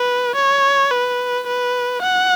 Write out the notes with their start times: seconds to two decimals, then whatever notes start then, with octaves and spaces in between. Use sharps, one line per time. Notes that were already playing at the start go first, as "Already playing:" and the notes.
Already playing: B4
0.36 C#5
0.92 B4
1.47 B4
2.02 F#5